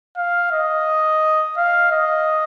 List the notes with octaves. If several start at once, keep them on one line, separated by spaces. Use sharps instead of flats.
F5
D#5
F5
D#5